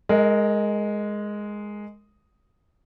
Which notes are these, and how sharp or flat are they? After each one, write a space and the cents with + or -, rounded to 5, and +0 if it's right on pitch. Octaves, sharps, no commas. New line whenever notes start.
G#3 +0 A#4 -15 D#5 +45